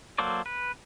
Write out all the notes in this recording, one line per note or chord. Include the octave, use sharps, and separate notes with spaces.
F#3 A#3 A4 C5 D5
B4